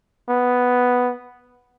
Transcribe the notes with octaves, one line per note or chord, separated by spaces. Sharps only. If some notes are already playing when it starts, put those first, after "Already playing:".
B3